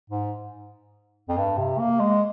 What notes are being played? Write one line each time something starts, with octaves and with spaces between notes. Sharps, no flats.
G#2
F2
G2
C3
A#3
G#3